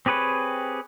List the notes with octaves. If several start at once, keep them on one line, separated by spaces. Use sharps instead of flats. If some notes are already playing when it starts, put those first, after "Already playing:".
C4 G4 G#4 B4 C#5